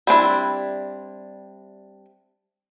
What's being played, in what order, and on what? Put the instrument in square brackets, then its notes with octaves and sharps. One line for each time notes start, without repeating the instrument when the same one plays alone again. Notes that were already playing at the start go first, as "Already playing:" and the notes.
[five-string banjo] G3 C4 D4 E4